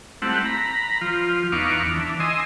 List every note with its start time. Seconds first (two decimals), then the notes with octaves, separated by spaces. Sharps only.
0.22 G3 A3 C4 E4 F#5
0.45 A#5 B5
1.01 F3 F4
1.52 E2 B3 D#4 F5 C#6 D6
1.94 E3 D4
2.20 D#5 G#5 C6 D#6 E6